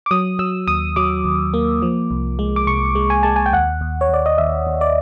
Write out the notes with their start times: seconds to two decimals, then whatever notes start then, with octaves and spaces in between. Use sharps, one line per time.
0.06 D6
0.11 F#3 D#6
0.39 F#3 E6
0.68 D#2 D#6
0.96 F#3 D6
1.25 D#2
1.54 A#3
1.82 F3
2.11 C2
2.39 G#3
2.56 D6
2.67 C2 C#6
2.95 G#3
3.10 G#5
3.23 G#3 A5
3.36 G#5
3.46 G5
3.53 D#2 F#5
3.81 D#2
4.01 C#5
4.09 D#2 D5
4.26 D#5
4.38 D#2 E5
4.67 D#2
4.81 D5